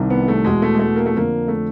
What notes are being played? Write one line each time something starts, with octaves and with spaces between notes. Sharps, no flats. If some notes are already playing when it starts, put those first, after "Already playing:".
Already playing: C2 C3 D#3
B3
A3
E2 B2 G#3
A3
G#3
A3
A#3
A3
F2 D3 A#3
A3